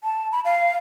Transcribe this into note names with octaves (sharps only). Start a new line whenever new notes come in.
A5
B5
F5